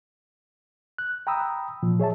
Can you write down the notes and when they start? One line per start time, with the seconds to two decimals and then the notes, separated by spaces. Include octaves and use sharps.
0.98 F#6
1.27 G5 A#5 B5 D#6 E6
1.83 A#2 F3
2.00 G#4 C#5 E5 A5